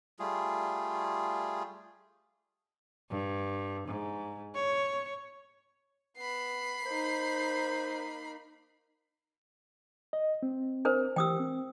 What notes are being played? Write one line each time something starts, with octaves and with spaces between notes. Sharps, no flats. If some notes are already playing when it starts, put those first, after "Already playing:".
G3 A3 F4 G#4
G2
G#2
C#5
B3 B5 C7
A#3 D#4 C5
D#5
C4
D4 A#4 C5
E3 G4 G5 D#6 E6
C4